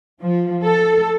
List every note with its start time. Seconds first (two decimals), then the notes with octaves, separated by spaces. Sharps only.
0.22 F3
0.64 A4